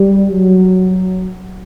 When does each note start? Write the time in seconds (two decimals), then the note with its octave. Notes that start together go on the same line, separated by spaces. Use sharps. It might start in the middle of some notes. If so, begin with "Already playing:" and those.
Already playing: G3
0.31 F#3